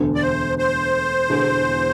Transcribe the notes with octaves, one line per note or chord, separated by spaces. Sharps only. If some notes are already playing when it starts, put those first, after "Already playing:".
Already playing: E1 D2 D3
D5
C5
C5
E1 E2 D3